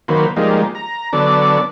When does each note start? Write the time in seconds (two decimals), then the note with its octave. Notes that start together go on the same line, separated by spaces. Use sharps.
0.08 D#3 F#3 A#3 B4 C5
0.36 F3 G3 G#3 A#3 D#4
0.75 A#5
1.13 D3 F#3 B3 D4 A4 D5